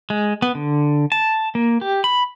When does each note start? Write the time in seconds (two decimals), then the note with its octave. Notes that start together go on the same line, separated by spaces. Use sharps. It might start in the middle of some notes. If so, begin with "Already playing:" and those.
0.10 G#3
0.42 B3
0.55 D3
1.12 A5
1.55 A#3
1.81 G4
2.04 B5